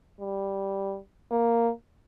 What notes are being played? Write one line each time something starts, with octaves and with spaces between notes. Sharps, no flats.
G3
A#3